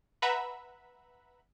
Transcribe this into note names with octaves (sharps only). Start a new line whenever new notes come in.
B4 E5 F#5 A#5 B5